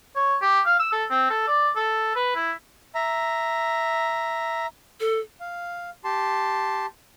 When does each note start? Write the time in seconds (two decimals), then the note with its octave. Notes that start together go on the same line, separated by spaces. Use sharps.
0.16 C#5
0.42 G4
0.66 F5
0.79 E6
0.92 A4
1.11 C4
1.30 A4
1.47 D5
1.76 A4
2.16 B4
2.36 E4
2.95 E5 A#5
5.00 A4
5.40 F5
6.04 G4 A5 C6